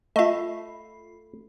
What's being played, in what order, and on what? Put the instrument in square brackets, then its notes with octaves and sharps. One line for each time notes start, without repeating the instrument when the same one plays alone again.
[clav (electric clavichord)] A3 [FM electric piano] F4 B5 [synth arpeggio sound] D#5 E5